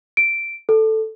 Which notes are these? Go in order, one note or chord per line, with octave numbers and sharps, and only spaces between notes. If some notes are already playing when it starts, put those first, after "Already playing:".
D7
A4